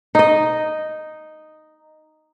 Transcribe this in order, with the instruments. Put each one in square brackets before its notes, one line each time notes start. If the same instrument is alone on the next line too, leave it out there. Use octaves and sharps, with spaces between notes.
[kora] D#4 D#5